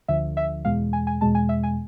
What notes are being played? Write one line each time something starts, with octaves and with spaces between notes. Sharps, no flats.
D2 D3 F3 E5
E5
E2 B2 G#3 F5
G#5
G#5
E2 B2 G#3 A5
G#5
E5
G#5